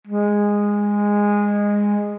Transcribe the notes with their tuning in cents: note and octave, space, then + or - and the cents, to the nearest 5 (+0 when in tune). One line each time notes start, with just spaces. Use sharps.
G#3 -15